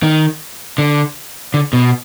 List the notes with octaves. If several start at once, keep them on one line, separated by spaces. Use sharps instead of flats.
D#3
D3
D3
B2